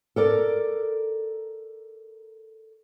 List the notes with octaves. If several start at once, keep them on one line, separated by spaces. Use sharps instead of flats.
A4 A#4 D5